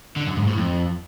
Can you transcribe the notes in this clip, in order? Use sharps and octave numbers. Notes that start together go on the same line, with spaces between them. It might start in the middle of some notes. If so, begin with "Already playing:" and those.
D3
F#2
G#2
A2
F2